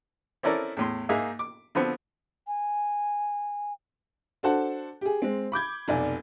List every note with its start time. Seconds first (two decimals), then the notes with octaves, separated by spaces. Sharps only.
0.43 C4 C#4 E4 A4 A#4 D5
0.77 E2 A2 C6
1.09 G#2 A#3 D#4 G#4 E5
1.39 D6
1.75 D3 F3 B3 C4
2.47 G#5
4.43 D4 F#4 A4 C5 F#5 A5
5.01 G4 G#4
5.22 G#3 C4
5.52 B5 D6 G6 G#6
5.88 F1 B1 D5 G#5